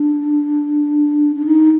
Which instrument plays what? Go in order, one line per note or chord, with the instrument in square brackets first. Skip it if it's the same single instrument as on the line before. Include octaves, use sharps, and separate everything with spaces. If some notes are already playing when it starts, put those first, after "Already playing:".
Already playing: [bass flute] D4
D4
D#4